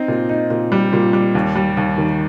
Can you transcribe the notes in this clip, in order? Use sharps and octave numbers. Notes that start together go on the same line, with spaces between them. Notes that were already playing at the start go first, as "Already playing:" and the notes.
Already playing: C4 D#4
A#2
D#4
A#2
G3
A#2
G3
D#2
G3
D#2
D#3